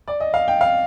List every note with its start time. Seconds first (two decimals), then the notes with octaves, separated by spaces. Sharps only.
0.08 D5
0.20 D#5
0.34 F5
0.48 G5
0.61 F5